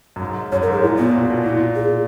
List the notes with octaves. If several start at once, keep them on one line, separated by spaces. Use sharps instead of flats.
F#2
G#2
F#2 C#5
A#4
G#2 G#4
A#2 E4
B2 B3
A#2
B2
A#2 E4
G#4